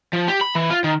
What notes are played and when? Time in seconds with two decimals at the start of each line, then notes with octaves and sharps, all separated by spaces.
0.13 F3
0.28 G4
0.41 B5
0.55 E3
0.70 F4
0.84 D#3